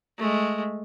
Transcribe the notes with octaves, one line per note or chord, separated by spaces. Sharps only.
G#3 A3